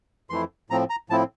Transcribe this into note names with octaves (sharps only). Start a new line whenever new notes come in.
F2 E3 A3 E4 C6
A2 F3 C4 A#5
A#5
A2 F3 C4 E4 A5